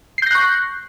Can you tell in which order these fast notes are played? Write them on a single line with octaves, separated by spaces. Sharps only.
C7 G6 A#6 F#6 C#6